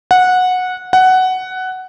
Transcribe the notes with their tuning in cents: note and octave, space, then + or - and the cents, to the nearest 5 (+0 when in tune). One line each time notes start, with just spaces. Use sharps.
F#5 -15
F#5 +10